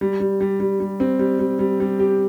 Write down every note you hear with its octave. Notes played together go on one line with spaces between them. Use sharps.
G3
G3
G3
G3
G3
C4
G3
G3
G3
G3
G4